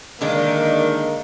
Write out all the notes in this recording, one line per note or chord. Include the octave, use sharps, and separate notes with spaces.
D3 D#3 G#3 A#3 D4